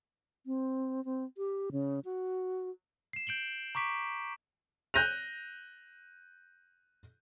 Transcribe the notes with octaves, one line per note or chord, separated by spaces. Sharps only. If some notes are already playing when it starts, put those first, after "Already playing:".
C4
C4
G4
C#3
F#4
C7 E7
G6 D7 F#7 G7
A#5 C#6 D6 B6 D7
F#6 G6 A#6 D#7 F7